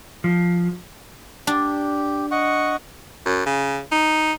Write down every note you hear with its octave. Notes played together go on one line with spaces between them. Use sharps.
F3
D4 G4
D#5 F#5 C#6
F#2
C#3
D#4